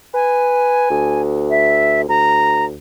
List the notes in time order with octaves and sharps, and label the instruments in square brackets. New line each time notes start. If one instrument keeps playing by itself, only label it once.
[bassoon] B4 [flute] G#5
[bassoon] D2
[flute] E5
[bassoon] D2 [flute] A#5